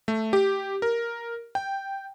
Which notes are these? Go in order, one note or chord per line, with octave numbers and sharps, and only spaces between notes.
A3
G4
A#4
G5